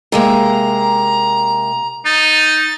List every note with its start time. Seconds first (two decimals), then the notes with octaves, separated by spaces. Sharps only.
0.12 C3 G#3 A#3 A#5
2.05 D#4 A6